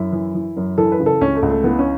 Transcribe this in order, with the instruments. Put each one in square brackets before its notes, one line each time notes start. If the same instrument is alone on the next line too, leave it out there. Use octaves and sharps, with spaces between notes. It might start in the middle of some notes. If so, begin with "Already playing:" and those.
Already playing: [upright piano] F#2 E4
E3
E3
F#2
E3 A4
B4
C#3
A4
C#2 C#4
A3
C#2
A3
E3 B3
C#4